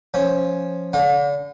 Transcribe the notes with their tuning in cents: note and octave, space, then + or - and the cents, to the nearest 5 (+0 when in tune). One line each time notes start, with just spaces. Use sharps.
F3 +0 C#4 +0
D3 -35 F5 +45